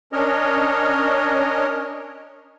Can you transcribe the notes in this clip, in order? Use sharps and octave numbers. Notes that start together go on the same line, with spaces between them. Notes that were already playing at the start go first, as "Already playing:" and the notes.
C#4 D4 A#4 C#5 D#5